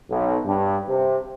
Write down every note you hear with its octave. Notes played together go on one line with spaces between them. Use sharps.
B1
G2
C3